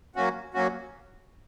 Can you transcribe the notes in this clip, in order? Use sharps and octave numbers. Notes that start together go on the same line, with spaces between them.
F#3 A#3 C#4 F#4
F#3 A#3 C#4 F#4